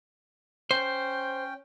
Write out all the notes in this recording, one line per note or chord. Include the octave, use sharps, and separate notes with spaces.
C#4 C5 G5